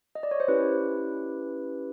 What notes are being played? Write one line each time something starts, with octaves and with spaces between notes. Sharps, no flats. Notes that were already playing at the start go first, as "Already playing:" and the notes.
D#5
D5
C#5
C5
C#4 E4 G4 B4